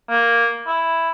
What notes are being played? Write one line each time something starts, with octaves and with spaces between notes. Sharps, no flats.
A#3
E4